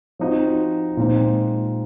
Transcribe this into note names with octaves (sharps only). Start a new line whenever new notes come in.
F3 C4 D#4 F#4
A#2 G#3 C4 D#4